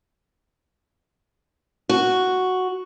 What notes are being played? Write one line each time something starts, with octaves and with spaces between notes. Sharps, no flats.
F#4